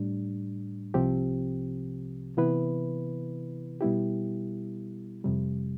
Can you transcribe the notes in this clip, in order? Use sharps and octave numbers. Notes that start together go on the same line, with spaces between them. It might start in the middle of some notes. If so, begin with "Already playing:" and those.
Already playing: A2 G3 D4
C2 C3 F3 C4 G4
C3 E3 B3 E4 B4
B2 G3 B3 E4 G4
F2 C3 G3